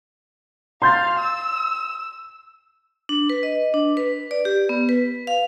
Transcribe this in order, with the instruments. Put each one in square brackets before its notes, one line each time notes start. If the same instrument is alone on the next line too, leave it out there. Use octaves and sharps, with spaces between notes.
[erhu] F5 [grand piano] C6 G6 A6
[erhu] E6
[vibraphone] D4
B4
D#5
D4
B4
D5
G4
B3
B4
F5